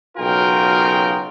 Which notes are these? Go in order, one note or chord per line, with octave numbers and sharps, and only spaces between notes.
B1 C#3 F4 F#4 A#4 G5